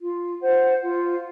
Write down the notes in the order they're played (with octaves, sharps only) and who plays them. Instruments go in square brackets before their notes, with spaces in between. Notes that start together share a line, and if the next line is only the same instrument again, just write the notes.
[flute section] F4
C5 F#5
F4